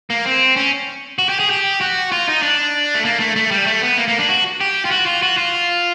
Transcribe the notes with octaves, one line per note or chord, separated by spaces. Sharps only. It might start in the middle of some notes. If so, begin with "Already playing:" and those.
A#3
C4
C#4
F#4
G4
G#4
G4
F#4
F4
D#4
D4
A3
A#3
A3
A3
G3
A3
B3
A#3
A#3
D4
F#4
G4
F4
F#4
F4
F#4
F4